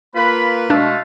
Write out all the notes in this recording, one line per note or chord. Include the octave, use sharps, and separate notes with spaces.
A#3 F4 B4 B5
B2 G#3 A3 D4 F5